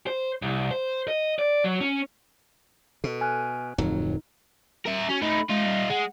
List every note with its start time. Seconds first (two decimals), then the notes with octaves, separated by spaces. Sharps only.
0.07 C5
0.42 C2
0.71 C5
1.08 D#5
1.39 D5
1.64 F#3
1.81 C#4
3.04 B2 A4
3.21 G#5 F6 F#6
3.78 D1 F2 F#3 D#4
4.86 A#4 E5
5.09 C#4 F#4
5.22 A3 D#4 B5
5.50 G#3 D#4 F4
5.66 G3
5.90 G#3 F#5